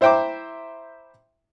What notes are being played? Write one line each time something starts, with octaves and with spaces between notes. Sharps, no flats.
E4 C5 E5 G5 A#5 D6